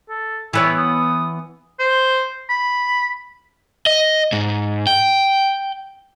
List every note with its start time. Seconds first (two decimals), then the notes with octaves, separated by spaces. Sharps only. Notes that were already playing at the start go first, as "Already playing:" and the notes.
0.09 A4
0.53 E3 B3 E4 C#5
0.78 D#6
1.80 C5
2.50 B5
3.86 D#5
4.32 G#2
4.87 G5